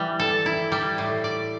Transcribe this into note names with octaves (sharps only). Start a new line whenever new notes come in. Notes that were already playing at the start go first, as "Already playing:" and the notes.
Already playing: E3 G3
A4
E4
G3
A2
D5